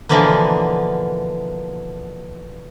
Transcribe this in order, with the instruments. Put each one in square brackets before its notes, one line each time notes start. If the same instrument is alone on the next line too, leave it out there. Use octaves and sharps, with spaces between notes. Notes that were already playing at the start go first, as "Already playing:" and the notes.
[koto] B2 D3 E3 F3 A#3 B3